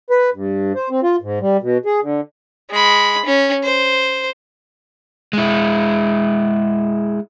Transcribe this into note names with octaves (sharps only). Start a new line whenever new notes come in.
B4
G2
C5
C4
F4
G#2
G3
B2
G#4
D3
G#3 B5
C#4
C5
G#3 E4